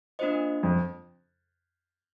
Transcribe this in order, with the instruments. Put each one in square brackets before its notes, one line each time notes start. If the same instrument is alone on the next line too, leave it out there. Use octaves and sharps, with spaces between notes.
[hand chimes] A#3 D4 F4 C5 D#5
[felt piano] F2